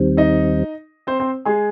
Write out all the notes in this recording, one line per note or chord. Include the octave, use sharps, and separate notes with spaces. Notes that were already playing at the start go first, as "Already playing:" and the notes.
Already playing: D#2 D#3 G3 C4
D#4 D#5
C4 C5
C4 C5
G#3 G#4